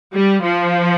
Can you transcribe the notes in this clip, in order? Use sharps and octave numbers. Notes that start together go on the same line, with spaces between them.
G3
F3